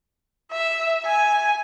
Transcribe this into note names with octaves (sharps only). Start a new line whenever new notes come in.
E5
G#5